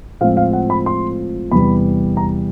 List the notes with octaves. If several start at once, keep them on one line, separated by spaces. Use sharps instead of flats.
A2 F3 G#3 C4 F4 F5
F5
F#5
B5
C6
E2 C3 E3 G3 B5
A#5